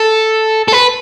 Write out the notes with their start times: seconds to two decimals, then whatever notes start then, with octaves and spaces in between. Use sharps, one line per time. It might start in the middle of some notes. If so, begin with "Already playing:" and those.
Already playing: A4
0.68 A4
0.73 B4